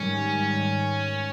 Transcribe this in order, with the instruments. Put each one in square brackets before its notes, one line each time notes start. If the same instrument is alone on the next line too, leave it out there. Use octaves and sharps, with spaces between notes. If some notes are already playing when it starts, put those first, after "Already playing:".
Already playing: [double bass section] G#2 D#3 G3 [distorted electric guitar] C#4